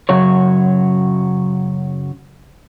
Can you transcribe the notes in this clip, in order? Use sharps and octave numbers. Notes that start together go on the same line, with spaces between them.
F#2 C#3 F#3 C#5